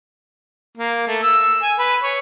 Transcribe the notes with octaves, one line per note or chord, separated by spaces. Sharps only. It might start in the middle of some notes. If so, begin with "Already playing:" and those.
A#3
A3
E6
G#5
B4
C#5